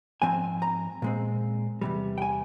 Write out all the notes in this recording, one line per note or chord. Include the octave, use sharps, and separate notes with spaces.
G#2 F3 C4 G#5
A#5
A#2 G#3 C4
E2 C3 G3
G5
G#5